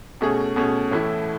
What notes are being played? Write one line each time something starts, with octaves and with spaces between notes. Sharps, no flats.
B2 A3 C#4 G#4
B2 A3 C#4 G#4
A2 E3 A3 E4